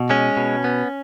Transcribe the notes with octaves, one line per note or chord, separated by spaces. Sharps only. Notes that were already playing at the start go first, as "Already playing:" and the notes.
Already playing: B2
G#3 C#4
B2
B3